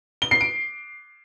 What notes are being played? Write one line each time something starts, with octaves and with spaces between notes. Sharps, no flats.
G7
C7
D7